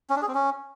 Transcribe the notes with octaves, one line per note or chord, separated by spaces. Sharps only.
C#4
D4
G#4
C4
C#4